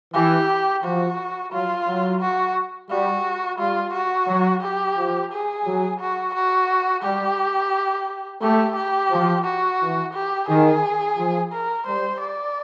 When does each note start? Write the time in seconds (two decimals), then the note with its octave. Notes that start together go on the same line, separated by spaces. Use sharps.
0.14 E3 G4
0.83 F3 F#4
1.52 F#3 F4
1.86 F#3
2.21 F#4
2.90 G3 F#4
3.58 G3 F4
3.93 F#4
4.27 F#3
4.62 G4
4.97 F3
5.32 G#4
5.65 F#3
6.00 F#4
6.34 F#4
7.03 G3 G4
8.42 A3 G4
8.76 G4
9.11 F3
9.44 F#4
9.80 E3
10.13 G4
10.47 D#3 G#4
11.17 F3
11.52 A#4
11.86 G3 C5
12.20 D5